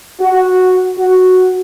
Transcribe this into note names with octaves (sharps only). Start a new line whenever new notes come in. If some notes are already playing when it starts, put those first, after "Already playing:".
F#4
F#4